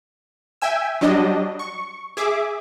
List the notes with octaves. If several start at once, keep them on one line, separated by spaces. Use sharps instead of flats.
E5 G5 G#5 E6
F#3 G3 D4 D#5
C#6
G#4 E5 D6